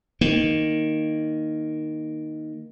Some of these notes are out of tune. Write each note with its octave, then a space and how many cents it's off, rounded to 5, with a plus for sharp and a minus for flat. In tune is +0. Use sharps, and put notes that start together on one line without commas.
D#3 +0 A#3 +0